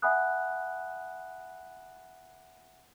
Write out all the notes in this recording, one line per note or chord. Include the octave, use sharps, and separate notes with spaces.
E5 F#5 G#5 B5 D#6 F#6